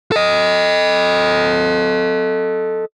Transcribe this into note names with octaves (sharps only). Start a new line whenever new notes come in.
A4 D#5